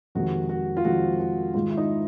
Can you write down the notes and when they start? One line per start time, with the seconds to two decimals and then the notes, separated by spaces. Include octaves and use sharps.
0.15 F2 C3 D#3 G#3 F#4
0.49 F#4
0.77 F4
0.84 F2 C3 D#3 G#3 F#4
1.20 F#4
1.54 G#2 D#3 G#3 F4
1.70 E4
1.77 D#4